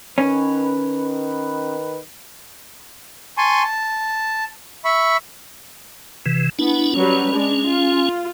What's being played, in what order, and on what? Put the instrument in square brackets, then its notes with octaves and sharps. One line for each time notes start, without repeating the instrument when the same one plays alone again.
[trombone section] D#3 B4 [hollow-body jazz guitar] C#4
[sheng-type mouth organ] G#5 A5 C6 C#6
A5
E5 B5 C#6
[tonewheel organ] C3 E3
[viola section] B3 [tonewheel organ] D4 E4
[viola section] F#3 G3 B4 [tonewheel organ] C#4
[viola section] G#3 D4
F4